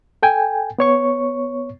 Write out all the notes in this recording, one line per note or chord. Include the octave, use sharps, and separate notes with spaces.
A4 G5 G#5
B3 C#5 C#6